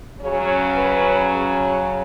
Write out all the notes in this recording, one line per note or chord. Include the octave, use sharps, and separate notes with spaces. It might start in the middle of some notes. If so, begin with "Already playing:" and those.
C#3 F#3 C#4 C#5
B4
G#4